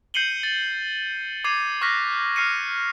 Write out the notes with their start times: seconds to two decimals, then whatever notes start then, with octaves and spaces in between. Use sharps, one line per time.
0.14 G6 C7 C#7 D#7 F#7 G7
0.43 A6
1.44 D6 G#6 C7 D#7
1.81 C#6 F6 F#6 A#6 B6
2.36 D6 F6 C7 C#7 D#7